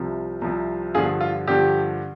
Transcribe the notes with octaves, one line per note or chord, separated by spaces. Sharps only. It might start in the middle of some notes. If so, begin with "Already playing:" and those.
Already playing: C2 C3 F3
C2 C3 F3
G2 D3 F3 F4 G#4
F4
G2 D3 F3 G4